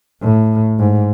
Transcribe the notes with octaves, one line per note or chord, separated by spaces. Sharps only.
A2
G#2